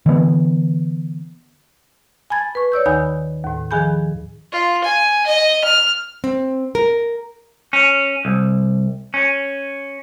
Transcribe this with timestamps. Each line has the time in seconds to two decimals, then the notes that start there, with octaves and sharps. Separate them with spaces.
0.06 D3 E3 G#3 B3
2.30 G#5 A5 B5 G#6 A6
2.55 B4 C#6
2.72 C#5 D5 E6 G6
2.86 D#2 D#3 D#4 G#5 B5 G6
3.44 D#2 A2
3.71 D#3 F3 G#4 G#5 B5 G6
4.52 F4
4.84 G#5
5.27 D#5
5.64 F6
6.24 C4
6.75 A#4
7.73 C#4
8.25 C2
9.14 C#4